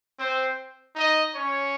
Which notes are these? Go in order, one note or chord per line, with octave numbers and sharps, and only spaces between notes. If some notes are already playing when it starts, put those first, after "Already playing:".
C4 C5
D#4 D#5
C#4 C#5